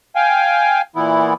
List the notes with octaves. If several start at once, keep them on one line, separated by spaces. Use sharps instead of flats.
F5 G5 G#5
A#2 E3 B3 E4